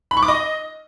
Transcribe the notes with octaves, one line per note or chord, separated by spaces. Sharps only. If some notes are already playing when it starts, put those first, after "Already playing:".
B5
C#6
D6
D#5